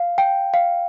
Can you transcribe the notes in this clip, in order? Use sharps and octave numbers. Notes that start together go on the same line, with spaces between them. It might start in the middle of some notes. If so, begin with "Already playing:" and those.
Already playing: F5
G5
F5